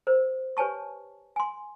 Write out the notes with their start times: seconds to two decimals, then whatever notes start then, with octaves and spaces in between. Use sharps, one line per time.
0.07 A#4 C5
0.57 G4 B4 C#5 G#5 A5 C#6
1.36 G#5 C6